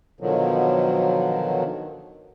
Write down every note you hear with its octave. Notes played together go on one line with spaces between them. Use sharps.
B2 D3 D#3 F3 F#3